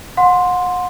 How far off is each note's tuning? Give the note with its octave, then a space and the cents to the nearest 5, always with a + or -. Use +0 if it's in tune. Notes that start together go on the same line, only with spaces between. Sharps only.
F#5 -40 C6 +0